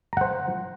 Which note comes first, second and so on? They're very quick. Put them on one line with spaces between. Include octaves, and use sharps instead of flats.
A#5 F#5 C5